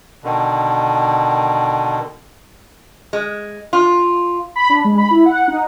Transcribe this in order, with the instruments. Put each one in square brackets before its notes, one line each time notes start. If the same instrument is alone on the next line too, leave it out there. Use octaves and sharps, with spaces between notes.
[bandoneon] B2 D3 D#3
[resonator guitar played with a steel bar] G#3
F4
[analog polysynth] B5
D4
G#3
B5
E4
F#5
D#4